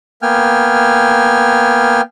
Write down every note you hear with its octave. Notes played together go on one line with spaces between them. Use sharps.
A#3 B3 G5 G#5 F6